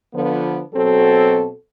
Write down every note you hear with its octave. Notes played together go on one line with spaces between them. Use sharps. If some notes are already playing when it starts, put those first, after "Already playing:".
D3 F3 B3
B2 F#3 C4 A4